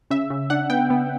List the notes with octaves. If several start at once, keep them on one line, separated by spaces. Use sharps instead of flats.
C#3 E5
C#3
D4 F#5
B3 G5
B3